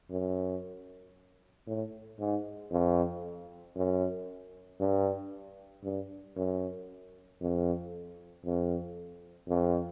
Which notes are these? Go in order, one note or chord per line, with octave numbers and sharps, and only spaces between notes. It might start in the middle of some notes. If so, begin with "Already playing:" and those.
F#2
A2
G#2
F2
F#2
G2
G2
F#2
F2
F2
F2